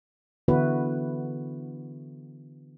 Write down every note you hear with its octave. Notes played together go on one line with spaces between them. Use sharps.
D3 E3 B3 E4 F#4 B4